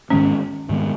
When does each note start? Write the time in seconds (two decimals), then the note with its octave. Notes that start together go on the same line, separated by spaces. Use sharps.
0.10 G#2 D#3 G#3 B3 C#4
0.69 G#2 D#3 G#3 B3